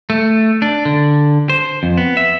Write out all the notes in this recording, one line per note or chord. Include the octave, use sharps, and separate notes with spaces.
A3
D4
D3
C5
F2
B3
E5